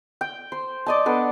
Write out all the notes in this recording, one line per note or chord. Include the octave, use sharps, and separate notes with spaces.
G5
C5
D5 D#5 A5
B3 D4 A4